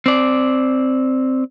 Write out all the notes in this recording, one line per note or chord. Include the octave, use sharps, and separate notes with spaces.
C4 D5